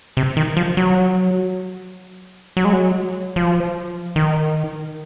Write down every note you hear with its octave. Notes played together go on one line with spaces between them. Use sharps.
C3
D#3
F3
F#3
F#3
G#3
F#3
F3
D#3